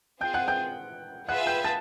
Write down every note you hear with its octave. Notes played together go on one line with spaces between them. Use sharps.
C4 F4 G#4 G5 G6
F#5 F#6
G5 G6
F4 G#4 B4 E5 F#5 F#6
G5 G6
A5 A6